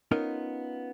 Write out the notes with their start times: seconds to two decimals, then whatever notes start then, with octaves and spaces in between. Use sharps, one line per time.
0.11 B3 C#4 D#4 F4 A#4 D#5